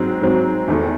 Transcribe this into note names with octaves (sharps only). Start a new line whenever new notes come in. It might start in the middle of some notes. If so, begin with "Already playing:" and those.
Already playing: G#2 F#3 C4
G#2 F#3 C4
E2 D#3 A3